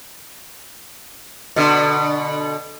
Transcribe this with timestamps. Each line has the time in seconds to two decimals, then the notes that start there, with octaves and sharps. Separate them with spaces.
1.56 B2 D3